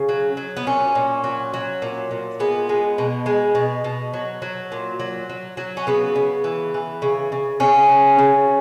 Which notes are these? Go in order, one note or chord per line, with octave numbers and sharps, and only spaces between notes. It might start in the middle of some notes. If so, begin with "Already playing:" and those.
Already playing: C#3
F#3
F#3
B3
A#2 C#4
A#2
F#3
F#3
A#2
A#2
G#3 B3
G#3
B2
G#3
B2
B2
F#3
F#3
A#2
F#3
F#3
F#3
C#4
C#3 B3
C#3
E3
E3
C#3
C#3
C#3 C#4
F#3
C#3